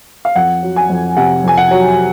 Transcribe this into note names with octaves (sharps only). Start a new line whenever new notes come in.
F5
F2 F#5
F#3
G#5
F2
C3 F#5
F2 G#5
F#5
F#3